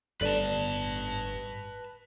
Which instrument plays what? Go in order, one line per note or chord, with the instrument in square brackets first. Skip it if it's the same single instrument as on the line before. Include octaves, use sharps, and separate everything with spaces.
[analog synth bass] G1 [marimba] A4 D5 [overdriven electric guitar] B4 A5